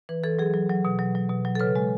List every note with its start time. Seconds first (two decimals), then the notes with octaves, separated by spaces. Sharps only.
0.09 E3 B4
0.24 E3 A4
0.39 F#3 G#4
0.54 F#3
0.69 F#3
0.85 B2
0.99 F#3
1.15 F#3
1.30 B2
1.45 F#3
1.55 A4
1.60 C#3 B4
1.76 G#3